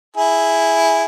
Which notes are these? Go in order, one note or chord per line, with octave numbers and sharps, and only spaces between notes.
E4 G#4